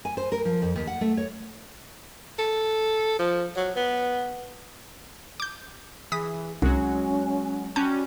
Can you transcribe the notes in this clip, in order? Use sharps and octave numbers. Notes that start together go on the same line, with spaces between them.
G#5
C5
A#4
F3
F2
D#2
F#5
A3
C#5
A4
F3
F#3
B3
D6 G6
E3 G#4 D#6 B6
C2 F#3 G#3 C#4 F#4
G3 C#4 F#4 A5 G6